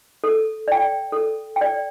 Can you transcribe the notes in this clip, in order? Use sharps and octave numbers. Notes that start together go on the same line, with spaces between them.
A4
D5 G5
A4
G5
D5